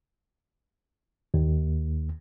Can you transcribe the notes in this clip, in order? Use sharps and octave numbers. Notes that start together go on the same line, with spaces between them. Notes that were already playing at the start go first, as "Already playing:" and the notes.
D#2